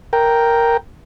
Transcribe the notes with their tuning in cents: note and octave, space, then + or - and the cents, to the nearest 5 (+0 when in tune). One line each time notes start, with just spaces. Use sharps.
A#4 +0 G5 +0